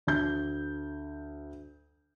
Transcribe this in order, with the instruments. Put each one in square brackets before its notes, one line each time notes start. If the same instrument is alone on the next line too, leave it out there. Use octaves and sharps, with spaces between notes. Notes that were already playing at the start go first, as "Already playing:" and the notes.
[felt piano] D2 G6